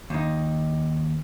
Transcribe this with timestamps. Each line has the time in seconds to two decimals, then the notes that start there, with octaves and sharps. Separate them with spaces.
0.10 D#2 D#4